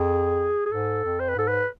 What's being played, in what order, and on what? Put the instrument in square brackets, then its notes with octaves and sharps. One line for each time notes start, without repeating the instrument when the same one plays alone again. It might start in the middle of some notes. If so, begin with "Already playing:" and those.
Already playing: [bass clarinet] F2 [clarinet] G#4
[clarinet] G#4
[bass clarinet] G#2 [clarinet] A4
[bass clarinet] F2
[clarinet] C5
B4
[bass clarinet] G#2 [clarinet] A4
[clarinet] B4